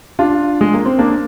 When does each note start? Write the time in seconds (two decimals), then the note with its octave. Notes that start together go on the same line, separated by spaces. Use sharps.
0.19 D4 F4
0.61 G#3
0.74 A#3
0.86 C4
0.99 A#3 D4